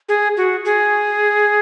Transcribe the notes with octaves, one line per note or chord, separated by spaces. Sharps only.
G#4
F#4
G#4